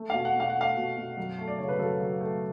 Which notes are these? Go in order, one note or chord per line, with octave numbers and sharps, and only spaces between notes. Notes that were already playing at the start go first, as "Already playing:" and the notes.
Already playing: A3
B2 F5
F#5
B2 F5
F#5
A3 F5
B2
B2
F#2
A3
D5
C#3 C#5
B4
F#2 A4
F#2
A3